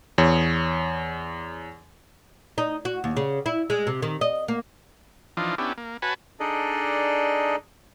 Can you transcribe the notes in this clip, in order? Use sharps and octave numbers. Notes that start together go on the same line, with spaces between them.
E2 C#5
D#4
F#4
D#2
C#3
E4
G#3
C3
D#3
D#5
A#3
E3 F3 D4 D#4 F4
B3 C#4 D4 E4 G4
A#3
F#4 B4 C#5 G#5 A5 B5
D4 D#4 G#4 A4 D5 D#5